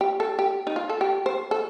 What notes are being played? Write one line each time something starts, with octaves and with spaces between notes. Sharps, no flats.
G4
A4
G4
D#4
F4
A4
G4
C5
A4